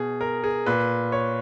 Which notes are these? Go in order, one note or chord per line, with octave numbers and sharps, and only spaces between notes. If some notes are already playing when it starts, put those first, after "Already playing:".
Already playing: B2 G#4
A#4
G#4
A#2 B4
C#5